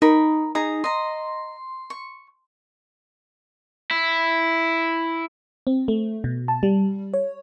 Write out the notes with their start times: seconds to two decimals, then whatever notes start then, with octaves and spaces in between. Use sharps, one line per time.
0.02 D#4 A#4 B5
0.55 D#4 G#4 A#5
0.84 D#5 A#5 C6
1.90 C#6
3.91 E4
5.67 C4
5.88 A3
6.24 B2
6.48 A5
6.63 G3
7.14 C#5